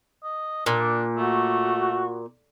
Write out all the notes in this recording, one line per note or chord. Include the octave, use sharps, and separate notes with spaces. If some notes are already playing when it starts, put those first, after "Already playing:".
D#5
A#2 D4
A3 F#4